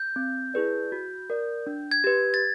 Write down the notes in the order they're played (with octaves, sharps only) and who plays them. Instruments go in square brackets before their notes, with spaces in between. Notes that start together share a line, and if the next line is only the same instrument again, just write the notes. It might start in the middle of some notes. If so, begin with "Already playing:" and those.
Already playing: [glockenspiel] G6
[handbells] C4
E4 G#4 B4 D5
F#4
A#4 D5
D4
[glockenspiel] G#6
[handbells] G4 B4
[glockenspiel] A6